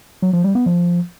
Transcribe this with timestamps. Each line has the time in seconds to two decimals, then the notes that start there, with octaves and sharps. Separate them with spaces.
0.22 F#3
0.33 F3
0.44 G3
0.55 B3
0.66 F3